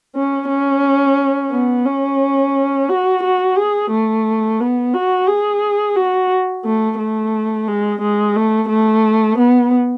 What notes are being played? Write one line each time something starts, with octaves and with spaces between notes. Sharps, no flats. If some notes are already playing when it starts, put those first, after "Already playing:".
C#4
C#4
B3
C#4
F#4
F#4
G#4
A3
B3
F#4
G#4
F#4
A3
A3
G#3
G#3
A3
A3
B3